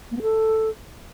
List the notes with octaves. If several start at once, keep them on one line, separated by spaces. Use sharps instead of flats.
A#3
B3
A4